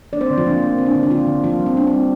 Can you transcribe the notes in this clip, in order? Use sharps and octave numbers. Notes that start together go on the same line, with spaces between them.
A#3 D4 D5
C4 C5
D3
F3 F4
A#3 D4
A#3
D3 C4
D4
D3 C4
D4
D3 F3 F4
D3
F3 A#3 F4
G3
C4
A#3 D4
C4
G3